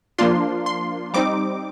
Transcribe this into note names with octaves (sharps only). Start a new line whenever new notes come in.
F3 A#3 D4 F4 C6
C6
G3 C4 D#4 D6